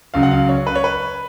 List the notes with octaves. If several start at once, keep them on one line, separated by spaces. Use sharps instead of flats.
C#2 C#3 F#3 F5
F#5
F5
C#5
B4
C#5
B4